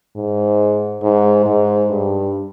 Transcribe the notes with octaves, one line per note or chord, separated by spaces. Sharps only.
G#2
G#2
G#2
G2